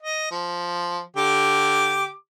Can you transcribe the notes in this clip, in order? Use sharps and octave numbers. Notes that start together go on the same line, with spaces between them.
D#5
F3
D3 G4 D6